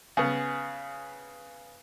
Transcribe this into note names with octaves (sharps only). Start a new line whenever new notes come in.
C#3 B3